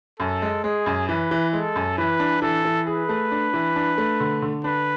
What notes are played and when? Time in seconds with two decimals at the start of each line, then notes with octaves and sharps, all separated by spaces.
0.20 F#2 A4
0.42 G#3
0.64 G#3 G#4
0.86 F#2
1.08 E3 B4
1.31 E3
1.53 G#3 A4
1.76 F#2
1.98 E3 B4
2.20 D4
2.42 E3 A4
2.65 E3
2.87 G#4 B4
3.09 A3
3.32 D4
3.54 E3
3.76 D4
3.98 A3
4.20 D3
4.42 D3
4.64 D4 B4